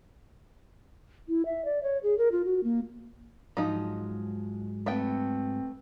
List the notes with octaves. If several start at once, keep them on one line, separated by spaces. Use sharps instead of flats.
E4
E5
D5
C#5
G#4
A#4
F4
F#4
A#3
G#2 F3 F#3 G#3 D#4
A3 B3 C4 G5